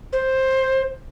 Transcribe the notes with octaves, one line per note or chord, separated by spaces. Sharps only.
C5